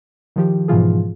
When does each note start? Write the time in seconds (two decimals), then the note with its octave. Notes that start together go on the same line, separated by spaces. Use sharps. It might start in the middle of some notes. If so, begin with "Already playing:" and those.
0.36 D#3 F3 G4
0.68 G#2 B2 E3 F3 F4 G#4